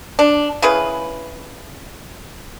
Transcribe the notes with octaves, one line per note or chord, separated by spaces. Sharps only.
D4
C#3 E4 G#4 B4